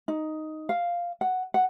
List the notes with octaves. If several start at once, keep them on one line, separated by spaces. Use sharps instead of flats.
D#4
F5
F#5
F#5